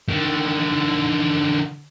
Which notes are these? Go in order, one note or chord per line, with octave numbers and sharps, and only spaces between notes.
D3 D#3